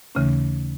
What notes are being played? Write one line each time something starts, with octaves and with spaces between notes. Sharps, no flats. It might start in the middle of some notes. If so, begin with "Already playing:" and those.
D#2 C#3 E3 A3 C#4